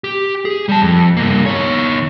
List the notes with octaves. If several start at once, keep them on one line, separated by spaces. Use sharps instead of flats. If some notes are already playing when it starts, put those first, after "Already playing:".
G4
G#4
G3 A5
F2
G2 A#3
D#3 C#5